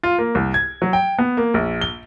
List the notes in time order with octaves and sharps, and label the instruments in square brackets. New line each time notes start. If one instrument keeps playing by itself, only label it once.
[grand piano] F4
A#3
C2
G#6
F#3
G5
B3
A#3
A#1
G7